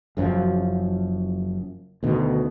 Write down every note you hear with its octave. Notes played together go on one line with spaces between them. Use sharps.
F#1 F#2 A#2 F3
D2 B2 D#3